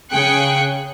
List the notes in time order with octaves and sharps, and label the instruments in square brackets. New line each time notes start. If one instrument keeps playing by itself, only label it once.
[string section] C#3 G#4 G5 F#6 C#7